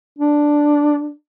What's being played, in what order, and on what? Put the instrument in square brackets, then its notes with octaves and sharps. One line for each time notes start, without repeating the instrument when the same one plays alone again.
[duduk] D4